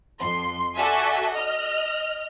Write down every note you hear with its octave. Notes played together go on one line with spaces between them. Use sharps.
F2 C6
F#4 A4 D5 E5 G#5
D#5 F6